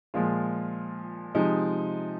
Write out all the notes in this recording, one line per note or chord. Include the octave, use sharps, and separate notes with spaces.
A#2 F3 G#3 F4
C3 F3 G#3 D#4